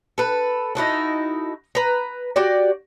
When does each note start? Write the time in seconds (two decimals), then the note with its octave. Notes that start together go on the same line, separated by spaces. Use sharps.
0.18 A4 B4
0.75 D#4 E4 F#4 A4
1.75 B4 A#5
2.36 F#4 G4 D5